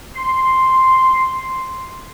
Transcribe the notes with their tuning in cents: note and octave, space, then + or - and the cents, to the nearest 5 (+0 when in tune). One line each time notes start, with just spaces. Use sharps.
C6 +0